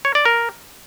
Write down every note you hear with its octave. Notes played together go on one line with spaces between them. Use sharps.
C#5
D5
A#4